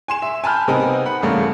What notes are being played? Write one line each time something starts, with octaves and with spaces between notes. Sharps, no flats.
G#5 C6 E7
E5
G#5 A5 B5 F6 G6
C3 B3 C4 D#4 A#4 G#5
F#5 B5
E2 G2 C#3 A3 A#3 C#4